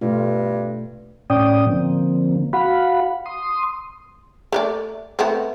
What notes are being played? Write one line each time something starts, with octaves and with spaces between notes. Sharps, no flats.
G2 B2 A3 F4
A2 C#4 D5 G5 D#6
D3 F3 A#3 C4
F#4 F5 F#5 B5
C6 D#6
A3 A#4 D5
A3 B3 C4